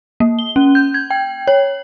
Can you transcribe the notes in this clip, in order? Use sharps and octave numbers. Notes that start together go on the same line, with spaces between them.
A#3
G7
C#4
G6
G#6
G5
C#5